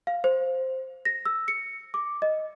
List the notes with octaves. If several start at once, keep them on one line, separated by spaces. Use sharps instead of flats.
F5
C5
A#6
E6
C#7
D6
D#5